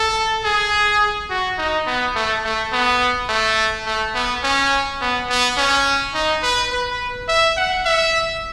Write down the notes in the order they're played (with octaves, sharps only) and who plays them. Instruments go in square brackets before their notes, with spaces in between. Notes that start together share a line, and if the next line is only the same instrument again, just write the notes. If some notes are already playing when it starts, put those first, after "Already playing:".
Already playing: [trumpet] A4
G#4
F#4
D#4
B3
A3
A3
B3
A3
A3
B3
C#4
B3
B3
C#4
D#4
B4
B4
E5
F#5
E5